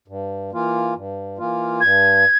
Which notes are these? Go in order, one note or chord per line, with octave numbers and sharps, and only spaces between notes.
G2
E3 A#3 F4
G2
E3 A#3 F4
G2 G#6